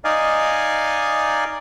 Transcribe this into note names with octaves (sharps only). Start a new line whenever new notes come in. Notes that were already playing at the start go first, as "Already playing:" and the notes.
D#4 D5 D#5 F5 G#5